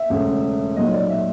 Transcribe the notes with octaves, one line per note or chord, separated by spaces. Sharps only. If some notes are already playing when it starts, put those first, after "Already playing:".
Already playing: E5
E1 D2 C#3
B1 A#2 F#3 D#5
D5
E5